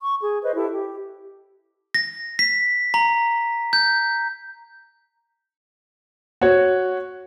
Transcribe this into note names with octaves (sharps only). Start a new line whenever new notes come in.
C#6
G#4
B4 C5 D#5
E4 G4 A4
G4
A#6
B6
A#5
G6
F#4 C#5